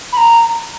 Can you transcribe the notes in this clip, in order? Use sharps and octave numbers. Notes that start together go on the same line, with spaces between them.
B5
A#5